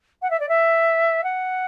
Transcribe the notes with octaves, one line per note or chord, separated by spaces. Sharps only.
F#5
E5
D5
E5
F#5